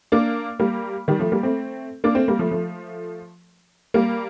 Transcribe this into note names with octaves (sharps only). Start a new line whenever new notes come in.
A#3 D4
G3 A#3
D#3 G3
F3 A3
G3 A#3
A3 C4
A#3 D4
A3 C4
G3 A#3
F3 A3
F3 A3
G3 A#3